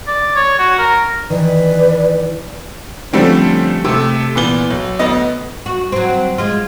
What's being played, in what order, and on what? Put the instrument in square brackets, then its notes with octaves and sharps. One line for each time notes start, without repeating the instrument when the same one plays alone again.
[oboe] D5
C#5
F#4
A#4
[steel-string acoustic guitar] D#3 E3 [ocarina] B4 [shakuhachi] D5
[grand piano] D3 F3 G3 A3 C4 C#4
C3 A3
A#2 E3 B3 G7
B1
D2 B3 D#5
[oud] F#4
F#3 C4
G#3 F4